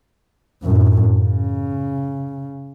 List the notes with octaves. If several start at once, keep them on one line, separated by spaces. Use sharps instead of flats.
F#2 A2
C#3